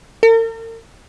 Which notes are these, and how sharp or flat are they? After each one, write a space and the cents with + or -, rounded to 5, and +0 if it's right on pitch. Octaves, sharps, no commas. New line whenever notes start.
A#4 -45